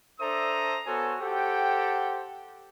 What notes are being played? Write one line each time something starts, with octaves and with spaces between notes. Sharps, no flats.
D4 A4 C5 E5 A#5 D#6
B3 F#4 A4 C5 C#5 G#5
G4 A4 C5 F#5 G5